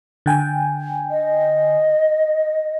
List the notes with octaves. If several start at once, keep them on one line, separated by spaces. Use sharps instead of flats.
D3 G5 G#5
D#5